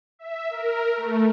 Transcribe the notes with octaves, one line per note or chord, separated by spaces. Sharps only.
E5
A#4
A3